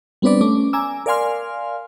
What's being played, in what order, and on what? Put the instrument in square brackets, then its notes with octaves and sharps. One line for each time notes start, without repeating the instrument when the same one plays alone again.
[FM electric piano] G3 B3 C4 D4 B4 D5
A3 C#4 D6
G#5 A#5 D6 E6
A#4 D5 F5 G#5 C6 F6